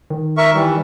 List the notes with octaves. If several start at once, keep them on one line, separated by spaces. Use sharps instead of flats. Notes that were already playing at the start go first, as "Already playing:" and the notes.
D#3
A#4 E5 C#6
E3 G3